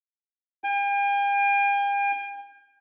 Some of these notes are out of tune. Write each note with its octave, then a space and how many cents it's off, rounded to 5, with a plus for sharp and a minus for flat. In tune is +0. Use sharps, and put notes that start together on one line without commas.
G5 +45